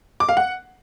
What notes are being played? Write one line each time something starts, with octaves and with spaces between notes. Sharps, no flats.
D6
F5
F#5